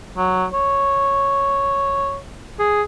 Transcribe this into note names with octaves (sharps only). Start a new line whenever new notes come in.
F#3
C#5
G#4